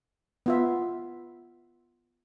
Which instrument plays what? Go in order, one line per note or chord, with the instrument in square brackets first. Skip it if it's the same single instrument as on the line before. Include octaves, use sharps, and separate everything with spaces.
[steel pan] B3 F4 E5